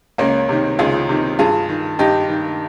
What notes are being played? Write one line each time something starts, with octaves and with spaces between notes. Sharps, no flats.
C#2 A#3 C#4
C3 D#3
C#2 F4 G#4
C3 D#3
G2 F4 G#4
D#3
G2 D#4 G4
D#3